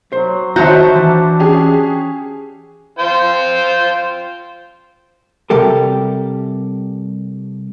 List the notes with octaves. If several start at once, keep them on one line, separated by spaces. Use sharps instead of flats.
F#3 C5
D#3 F#4 C5 C#5 E5 A5 A#5 G6
E3 D4
C#4 G4 G#4
F4 C5 G5
C3 G3 G4 A4 A#4